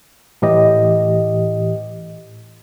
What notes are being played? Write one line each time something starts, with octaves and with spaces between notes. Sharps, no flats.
A2 E3 G4 D#5